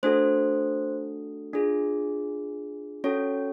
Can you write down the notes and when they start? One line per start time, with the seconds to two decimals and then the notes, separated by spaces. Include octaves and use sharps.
0.03 A3 D4 F#4 A4 C5
1.53 D4 F4 G#4
3.04 C#4 F#4 A4 C#5